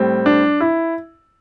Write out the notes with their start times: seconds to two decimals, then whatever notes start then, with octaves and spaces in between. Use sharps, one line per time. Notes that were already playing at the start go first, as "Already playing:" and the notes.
Already playing: A2 G3 C4
0.26 D4
0.60 E4